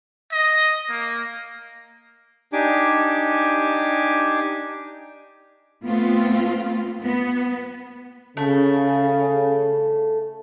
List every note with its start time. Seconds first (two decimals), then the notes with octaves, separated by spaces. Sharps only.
0.32 D#5
0.90 A#3
2.53 D4 D#4 G4 G#5 D6
5.84 A3 B3 C4 F4
7.04 B3
8.37 C#3 A3